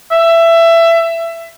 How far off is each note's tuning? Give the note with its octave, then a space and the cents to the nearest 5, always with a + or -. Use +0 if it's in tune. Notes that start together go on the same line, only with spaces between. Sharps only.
E5 +20